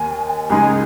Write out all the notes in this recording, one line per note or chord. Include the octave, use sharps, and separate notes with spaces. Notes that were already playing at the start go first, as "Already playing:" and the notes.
Already playing: D#2 D#3 G#5
C#2 C#3 G#3 D#4 G#5